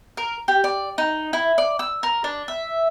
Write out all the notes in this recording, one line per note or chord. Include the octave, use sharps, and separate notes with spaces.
A#4
G4
D5
D#4
E4
D5
E6
A#4
D4
E5